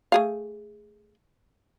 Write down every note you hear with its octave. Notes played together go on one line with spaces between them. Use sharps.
A3 G#4 F5